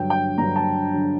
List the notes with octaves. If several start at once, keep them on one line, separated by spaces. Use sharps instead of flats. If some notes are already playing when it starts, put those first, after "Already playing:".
Already playing: G2 D3 F#3 G5
G5
G2 D3 F#3 A#5
A5
D3 F#3